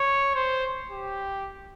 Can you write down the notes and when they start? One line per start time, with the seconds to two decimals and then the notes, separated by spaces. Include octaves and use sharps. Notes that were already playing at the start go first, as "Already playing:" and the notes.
Already playing: C#5
0.35 C5
0.91 G4